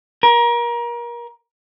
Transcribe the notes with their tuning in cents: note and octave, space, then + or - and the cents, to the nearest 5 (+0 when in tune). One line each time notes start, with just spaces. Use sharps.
A#4 +30